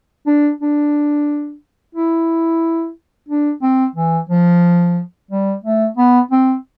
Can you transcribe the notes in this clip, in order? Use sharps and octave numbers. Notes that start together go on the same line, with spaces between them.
D4
D4
E4
D4
C4
E3
F3
G3
A3
B3
C4